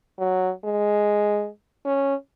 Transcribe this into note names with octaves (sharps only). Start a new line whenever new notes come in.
F#3
G#3
C#4